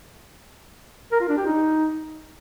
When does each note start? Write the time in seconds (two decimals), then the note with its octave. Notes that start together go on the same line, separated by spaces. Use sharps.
1.12 A#4
1.21 F4
1.29 D4
1.37 G4
1.46 D#4